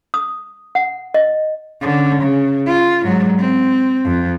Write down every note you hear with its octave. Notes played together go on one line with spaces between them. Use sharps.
D#6
F#5
D#5
D3 C#4
C#3
F4
G#2 F#3
C4
F2